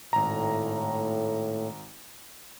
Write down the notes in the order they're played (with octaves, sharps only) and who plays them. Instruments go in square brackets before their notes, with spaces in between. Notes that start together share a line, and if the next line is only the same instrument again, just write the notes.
[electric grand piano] G#1 A#5 [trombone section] A2